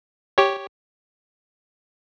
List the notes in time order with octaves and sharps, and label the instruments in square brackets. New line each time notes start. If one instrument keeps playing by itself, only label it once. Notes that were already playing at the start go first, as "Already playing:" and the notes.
[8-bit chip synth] G4 C#5